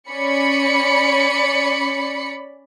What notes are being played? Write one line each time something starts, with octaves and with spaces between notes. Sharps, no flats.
C#4 D5 B5 C#7